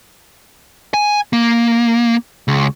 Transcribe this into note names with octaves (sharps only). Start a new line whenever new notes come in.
G#5
A#3
C#2